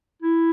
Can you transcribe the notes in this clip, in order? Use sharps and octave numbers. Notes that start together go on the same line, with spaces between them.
E4